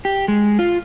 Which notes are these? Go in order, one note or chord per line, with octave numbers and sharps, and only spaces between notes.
G4
G#3
F4